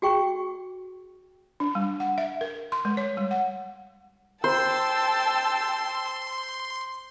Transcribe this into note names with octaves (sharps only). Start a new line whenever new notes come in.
F#4 G#4 G5 C#6
D4
G3
F#5
E5
A#4
C6
G#3
C#5
G3
F#5
C5 G5 A5 C6 E6